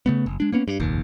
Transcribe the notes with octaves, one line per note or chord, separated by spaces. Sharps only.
C#3 A3 B3
F#1
G#3 D4
A#3 B3 C#4
G2
F1 A#1 D#2